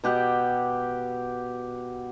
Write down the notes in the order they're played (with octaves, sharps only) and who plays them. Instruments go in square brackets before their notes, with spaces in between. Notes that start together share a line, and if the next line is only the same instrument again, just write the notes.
[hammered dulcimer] B2 G4 F#5 G5